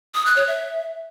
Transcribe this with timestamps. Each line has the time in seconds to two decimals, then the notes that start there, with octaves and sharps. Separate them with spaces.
0.15 D#6
0.25 F#6
0.36 C#5
0.47 E5